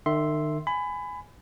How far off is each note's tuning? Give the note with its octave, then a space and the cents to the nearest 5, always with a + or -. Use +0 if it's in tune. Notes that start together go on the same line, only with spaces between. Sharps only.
D#3 -40 E5 +0 C6 +0
G#5 +0 B5 +25